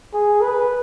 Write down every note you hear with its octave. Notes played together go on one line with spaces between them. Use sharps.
G#4
B4